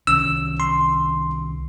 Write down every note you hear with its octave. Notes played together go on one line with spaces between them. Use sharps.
C2 D#3 C#4 E6
C6